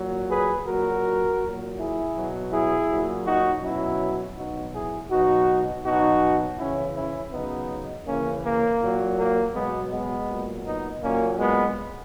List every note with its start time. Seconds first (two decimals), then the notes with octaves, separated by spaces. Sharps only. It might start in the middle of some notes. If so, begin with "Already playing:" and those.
Already playing: A#2 F#3
0.30 G#4 B4
0.67 A#2 F#3 F#4 A#4
1.41 A#2 F#3
1.78 E4 G#4
2.15 B2 F#3
2.51 E4 G#4
2.89 A#2 F#3
3.26 D#4 F#4
3.62 B2 F#3 C#4 E4
4.37 B2 F#3 D#4 F#4
4.74 E4 G#4
5.10 B2 F#3 D#4 F#4
5.85 B2 F#3 D#4 F#4
6.58 C#3 E3 C#4 E4
6.95 C#4 E4
7.33 C#3 F#3 B3 D#4
8.06 C#3 E3 A#3 C#4
8.44 A#3
8.81 A#2 F#3
9.18 A#3
9.54 B2 F#3 G#3 B3
9.91 G#3 B3
10.29 A#2 F#3
10.66 B3 D#4
11.02 A#2 F#3 A#3 C#4
11.39 G#3 B3